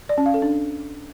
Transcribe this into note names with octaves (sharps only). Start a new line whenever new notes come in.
D5
C#4
F5
A4
D4